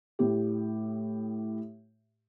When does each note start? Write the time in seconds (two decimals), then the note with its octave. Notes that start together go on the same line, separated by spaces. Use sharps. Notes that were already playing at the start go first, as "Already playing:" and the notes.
0.19 A2 G4